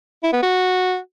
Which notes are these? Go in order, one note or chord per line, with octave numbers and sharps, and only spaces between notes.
E4
B3
F#4